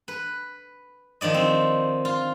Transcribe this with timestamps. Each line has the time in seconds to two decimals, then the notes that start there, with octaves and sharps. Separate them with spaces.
0.08 B4
1.21 D#3 F3 D5 D#5
1.34 C4
2.05 F4